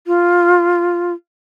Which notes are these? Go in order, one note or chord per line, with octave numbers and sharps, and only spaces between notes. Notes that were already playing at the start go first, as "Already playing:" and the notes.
F4